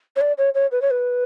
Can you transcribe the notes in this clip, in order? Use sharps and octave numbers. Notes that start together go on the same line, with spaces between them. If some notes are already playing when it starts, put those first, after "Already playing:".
C#5
D5
C#5
C#5
B4
C#5
B4